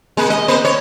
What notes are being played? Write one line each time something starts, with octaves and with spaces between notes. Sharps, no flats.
G#3 A#3
D#5
A#3 C5
C#5